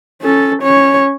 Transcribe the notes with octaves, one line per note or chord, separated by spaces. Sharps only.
C#4 A4
C#4 C#5